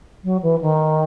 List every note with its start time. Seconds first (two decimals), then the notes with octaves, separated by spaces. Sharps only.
0.24 F#3
0.43 E3
0.61 D#3